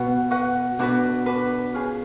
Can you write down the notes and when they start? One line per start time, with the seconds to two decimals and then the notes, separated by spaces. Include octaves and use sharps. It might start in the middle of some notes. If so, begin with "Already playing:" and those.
Already playing: B2 F#4 B4 F#5
0.31 F#4 B4 F#5
0.79 B2 D4 F#4 B4
1.26 D4 F#4 B4
1.74 C#4 F4 G#4